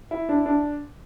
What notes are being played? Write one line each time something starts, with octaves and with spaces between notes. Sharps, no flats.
E4
D4
D4